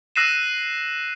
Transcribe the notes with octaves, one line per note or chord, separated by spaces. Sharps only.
E6 F#6 A#6 C7 D#7 E7